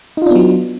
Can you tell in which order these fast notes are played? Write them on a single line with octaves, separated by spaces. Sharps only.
D#4 F4 D4 B3 F#3